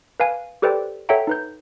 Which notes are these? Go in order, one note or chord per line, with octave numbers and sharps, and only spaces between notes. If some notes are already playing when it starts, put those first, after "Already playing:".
B4 F5 G#5
G4 A4 B4 C5 D5 G5
A4 C#5 E5 F#5 G5 A#5
D#4 B4 G6